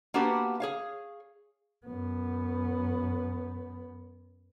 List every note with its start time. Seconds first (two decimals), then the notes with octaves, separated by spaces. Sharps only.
0.14 A#3 B3 D4 F#4 G4 B4
0.60 G#4 C#5 F5
1.86 F#2 B3